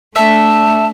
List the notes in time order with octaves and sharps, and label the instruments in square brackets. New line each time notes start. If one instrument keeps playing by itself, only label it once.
[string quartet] A3 D4 [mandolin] E5 [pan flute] A5